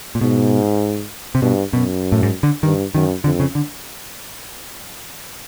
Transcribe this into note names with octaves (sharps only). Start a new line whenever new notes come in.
A#2
G#2 B2
C3
G2 B2
F#2 B2
A2
G#2
D3
G2 D#3
F#2 D#3
F2 D3
C#3
D3